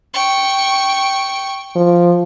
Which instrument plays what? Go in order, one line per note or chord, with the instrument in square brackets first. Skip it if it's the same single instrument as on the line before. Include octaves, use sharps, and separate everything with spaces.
[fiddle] G5 C#6
[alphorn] F3